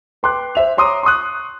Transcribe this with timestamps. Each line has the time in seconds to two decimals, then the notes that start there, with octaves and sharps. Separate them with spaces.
0.23 B4 G5 C6 D6 F#6
0.55 C5 E5 F7
0.77 C#5 A#5 C6 D6 D#6
1.03 C6 C#6 D#6 F#6